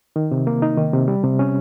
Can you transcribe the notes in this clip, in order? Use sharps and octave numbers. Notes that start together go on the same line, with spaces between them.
D#3
C3
A#3
D#4
D#3
C3
G3
C3
C#4